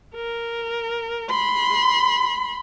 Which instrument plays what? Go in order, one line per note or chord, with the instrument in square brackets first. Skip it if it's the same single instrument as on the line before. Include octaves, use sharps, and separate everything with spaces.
[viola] A#4
B5 C6